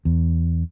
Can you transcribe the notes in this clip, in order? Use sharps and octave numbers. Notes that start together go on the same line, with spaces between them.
E2